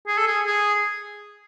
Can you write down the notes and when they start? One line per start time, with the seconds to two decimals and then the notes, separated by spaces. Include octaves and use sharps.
0.08 G#4
0.18 A4
0.27 G#4
0.46 G#4